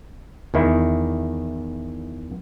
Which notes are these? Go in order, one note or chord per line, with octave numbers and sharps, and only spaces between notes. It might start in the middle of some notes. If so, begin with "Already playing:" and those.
E2 D#3 E4